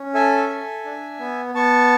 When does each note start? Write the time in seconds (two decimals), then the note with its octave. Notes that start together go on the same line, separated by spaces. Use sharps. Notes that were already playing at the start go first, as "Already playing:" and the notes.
Already playing: C#4
0.14 A4 E5 G#5
0.50 A4
0.85 D4
1.19 B3
1.55 B3 A5 C#6